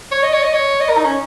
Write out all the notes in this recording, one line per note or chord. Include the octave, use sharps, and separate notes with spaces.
C#5
D#5
C#5
D#5
C#5
D#5
A#4
D#4
C#4